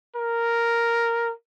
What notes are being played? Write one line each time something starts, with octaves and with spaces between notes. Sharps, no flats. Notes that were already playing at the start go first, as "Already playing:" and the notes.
A#4